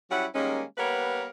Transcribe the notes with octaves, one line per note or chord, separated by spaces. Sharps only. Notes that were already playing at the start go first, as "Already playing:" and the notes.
F#3 G3 C#4 E4 F#5
D#3 G3 G#3 A#3 C#4
G3 A#3 B3 A#4 B4 C#5